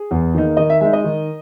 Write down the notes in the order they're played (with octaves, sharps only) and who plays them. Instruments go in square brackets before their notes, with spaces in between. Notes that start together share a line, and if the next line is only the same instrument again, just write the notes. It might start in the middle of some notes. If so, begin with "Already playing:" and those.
Already playing: [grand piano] G#4
E2
D#3 A#3 D#4
D#3 D#5
E5
G#3 D#4 E5
D#5
D#3